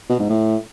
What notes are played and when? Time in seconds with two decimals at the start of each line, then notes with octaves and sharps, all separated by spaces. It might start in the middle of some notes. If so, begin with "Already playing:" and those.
0.09 B2
0.19 G#2
0.29 A2